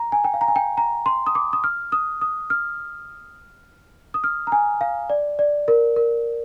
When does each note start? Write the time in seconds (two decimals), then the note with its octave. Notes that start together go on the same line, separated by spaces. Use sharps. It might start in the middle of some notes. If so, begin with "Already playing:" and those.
Already playing: A#5
0.12 G#5
0.24 G5
0.34 F5
0.41 A#5
0.48 G#5
0.56 G5
0.78 A#5
1.06 C6
1.26 D#6
1.35 D6
1.53 D#6
1.64 F6
1.92 D#6
2.21 D#6
2.50 F6
4.14 D#6
4.24 F6
4.47 A#5
4.52 G#5
4.81 F5
5.10 D5
5.39 D5
5.68 A#4
5.96 A#4